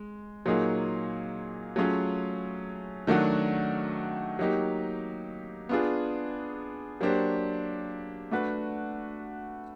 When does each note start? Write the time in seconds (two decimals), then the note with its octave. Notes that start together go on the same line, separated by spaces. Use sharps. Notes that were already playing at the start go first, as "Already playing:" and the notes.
Already playing: G#3
0.46 A#2 F#3 A#3 D#4 G#4
1.76 F#3 A3 C#4 F4 G#4
3.07 D#3 F#3 A3 D4 F#4
4.39 F#3 A#3 D#4 G4
5.69 B3 D4 F4 G#4
7.01 F#3 A#3 D4 G4 C5
8.31 A3 D4 F#4 B4